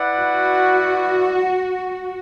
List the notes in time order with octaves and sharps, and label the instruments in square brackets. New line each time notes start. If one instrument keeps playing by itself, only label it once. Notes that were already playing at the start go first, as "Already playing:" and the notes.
Already playing: [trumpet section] E4 B4 D5 F#5
[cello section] F#4